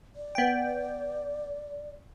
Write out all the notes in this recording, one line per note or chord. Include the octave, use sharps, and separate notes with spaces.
D5
B3 G5